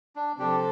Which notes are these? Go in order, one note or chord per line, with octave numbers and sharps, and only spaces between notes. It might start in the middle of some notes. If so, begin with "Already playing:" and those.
D4
C3 F3 C4 D4 G4 A4 C5